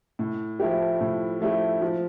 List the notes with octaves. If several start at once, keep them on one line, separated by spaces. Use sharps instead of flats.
A2
F3 A3 E4 G4
A2
F3 A3 E4 G4
F3